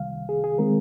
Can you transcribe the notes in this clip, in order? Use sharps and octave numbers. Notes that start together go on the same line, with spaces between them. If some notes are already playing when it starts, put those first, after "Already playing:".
Already playing: C2 C3 D#3 G3 F5
G#4
G#4
D#3 G#3 C4 A#4